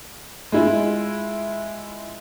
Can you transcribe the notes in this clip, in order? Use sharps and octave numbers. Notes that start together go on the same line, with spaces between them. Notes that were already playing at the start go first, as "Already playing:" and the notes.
G#3 E4 F4